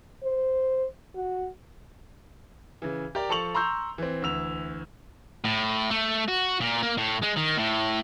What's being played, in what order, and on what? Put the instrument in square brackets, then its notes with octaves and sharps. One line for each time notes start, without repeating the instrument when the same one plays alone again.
[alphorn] C5
F#4
[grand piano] C#3 E3
G4 A#4 D5
F3 A4 A5 C#6 F7 F#7
A#5 C6 C#6 E6 G6
E3 C4
D2 E3 E6 F7
[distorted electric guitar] A2
A3
F#4
A#2
A#3
A2
G#3
D#3
A2